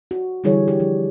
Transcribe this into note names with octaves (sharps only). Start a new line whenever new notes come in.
F#4
D3 E3 G3 E4 G#4 C#5
G4
F3